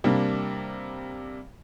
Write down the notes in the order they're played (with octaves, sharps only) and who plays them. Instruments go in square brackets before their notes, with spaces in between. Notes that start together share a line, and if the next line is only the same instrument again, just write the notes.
[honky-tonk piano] C3 G3 A#3 D4